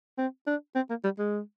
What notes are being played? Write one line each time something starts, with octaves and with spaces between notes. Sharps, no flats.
C4
D4
C4
A#3
G3
G#3